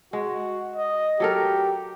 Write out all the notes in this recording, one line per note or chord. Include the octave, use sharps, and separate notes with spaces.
G#3 F#4
D#5
F#3 G4 A4 A#4